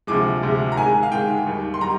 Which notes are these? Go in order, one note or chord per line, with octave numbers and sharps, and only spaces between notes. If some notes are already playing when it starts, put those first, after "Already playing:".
D2 C3 F3 G#3 D6
D2 C3 F3 G#3
A#5
G#2 D#3 G#3 G#5
F5
G#2 D#3 G#3 G5
D#2 D#3 G3
C6
D#3 G3 A#5